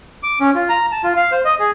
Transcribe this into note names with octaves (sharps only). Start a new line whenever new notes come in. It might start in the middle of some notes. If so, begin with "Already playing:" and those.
D6
C#4
F4
A#5
A5
F4
F5
C5
D#5
G#4